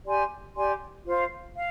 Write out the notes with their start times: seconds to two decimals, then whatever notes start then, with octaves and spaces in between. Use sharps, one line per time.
0.06 G4 D5 G#5 C6
0.55 G4 D5 G#5 C6
1.05 F4 C5 F5
1.55 F5